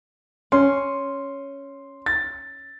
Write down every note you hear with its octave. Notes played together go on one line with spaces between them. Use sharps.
C#4 C6
A6